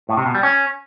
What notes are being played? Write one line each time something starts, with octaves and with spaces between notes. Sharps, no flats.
A2
C3
B2
G3
C#4